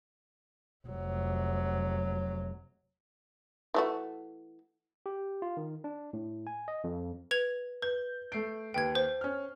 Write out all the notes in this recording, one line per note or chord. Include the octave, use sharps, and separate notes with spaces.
F1 F#3
E3 A3 F#4
G4
F4
D#3
D4
A2
G#5
D#5
F2
B4 G#6 F7
B4 G6
A3 C7 D7
D#2 B4 G5 G#6
C5
C#4 F6